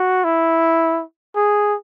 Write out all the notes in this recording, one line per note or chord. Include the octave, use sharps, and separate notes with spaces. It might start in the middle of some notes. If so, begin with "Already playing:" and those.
Already playing: F#4
E4
G#4